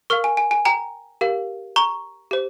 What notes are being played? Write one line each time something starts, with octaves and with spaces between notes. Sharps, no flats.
A#4 F5 C#6 F6
G#5
G#5
G#5
G5 A#5
G4 A#4 F5
A#5 C#6
G4 C5